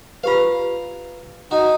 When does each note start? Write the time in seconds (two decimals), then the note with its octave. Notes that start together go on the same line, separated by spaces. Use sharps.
0.24 F4 G4 B4 F5 A#5
1.51 D#4 F#4